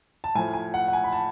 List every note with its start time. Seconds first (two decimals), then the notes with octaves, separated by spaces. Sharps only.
0.24 A5
0.35 A2 F3 G#5
0.54 G#5
0.74 F#5
0.88 F#5
0.93 G#5
1.04 B5
1.12 A5